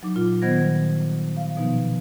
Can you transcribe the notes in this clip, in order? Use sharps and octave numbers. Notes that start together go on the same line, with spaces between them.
F#3 D#4 D6
A#2 F4
D#3 B3 C5 F#5 G#6 A#6
G3
F5
B2 F3 B3 D#4